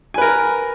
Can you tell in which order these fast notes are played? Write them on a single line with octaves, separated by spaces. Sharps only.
G#5 B4 A#4